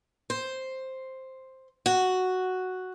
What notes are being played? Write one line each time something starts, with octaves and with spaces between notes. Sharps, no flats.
C5
F#4